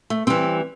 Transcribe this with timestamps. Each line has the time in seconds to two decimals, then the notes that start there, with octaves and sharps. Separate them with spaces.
0.10 A3
0.27 E3 G3 C4